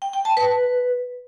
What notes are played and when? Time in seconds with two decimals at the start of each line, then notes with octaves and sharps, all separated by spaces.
0.02 G5
0.13 G5
0.25 A5
0.37 B4